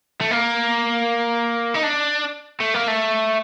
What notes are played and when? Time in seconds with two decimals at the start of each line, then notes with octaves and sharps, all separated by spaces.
0.21 A3
0.31 A#3
1.75 D#4
1.84 D4
2.60 A3
2.74 A#3
2.88 A3